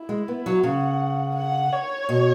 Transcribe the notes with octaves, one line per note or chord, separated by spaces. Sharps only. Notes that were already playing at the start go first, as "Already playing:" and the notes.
Already playing: E4
G#3
B3
F#3
C#3 F#5
F#5
C#5
B2